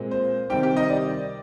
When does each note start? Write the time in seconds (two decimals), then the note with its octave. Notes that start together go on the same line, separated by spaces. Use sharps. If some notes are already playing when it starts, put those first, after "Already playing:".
Already playing: A#2 G#3 C4
0.11 C5
0.50 C3 D#3 G3 C4 G4 G5
0.63 G4 G5
0.77 D#4 D#5
0.90 D5